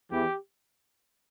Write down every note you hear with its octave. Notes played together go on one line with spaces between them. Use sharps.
E2 E3 G4